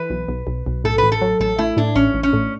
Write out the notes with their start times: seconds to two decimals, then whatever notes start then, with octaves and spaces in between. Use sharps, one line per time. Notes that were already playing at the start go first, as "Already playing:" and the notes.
Already playing: E3 B4
0.10 B1
0.28 B1
0.47 B1
0.66 B1
0.84 A2 A4
0.98 A1 B4
1.12 A4
1.21 F#3
1.40 A1 A4
1.58 A3 E4
1.77 A2 D4
1.95 A1 C#4
2.14 A1
2.23 C#4
2.33 A2